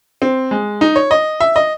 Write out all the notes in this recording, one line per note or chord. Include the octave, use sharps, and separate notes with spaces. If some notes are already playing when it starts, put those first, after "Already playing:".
C4
G#3
D#4
C#5
D#5
E5
D#5